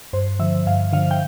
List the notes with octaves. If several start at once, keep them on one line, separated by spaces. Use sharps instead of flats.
G2 C5
D3 F3 E5
G2 F5
D3 F3 F5
G5